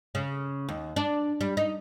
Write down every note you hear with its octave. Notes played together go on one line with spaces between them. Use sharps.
C#3
D#2
D4
G3
D#4